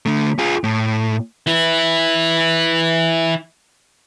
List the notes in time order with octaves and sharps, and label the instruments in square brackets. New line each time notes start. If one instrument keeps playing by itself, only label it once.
[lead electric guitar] D3 A3
F4 G#4
A2
E3 E4